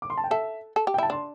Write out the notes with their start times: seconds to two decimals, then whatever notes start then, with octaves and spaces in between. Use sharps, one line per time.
0.02 D6
0.10 C6
0.17 A5
0.24 G5
0.31 A4 E5
0.76 A4
0.87 G4
0.94 G5
0.98 E4 A5
1.10 D4 C6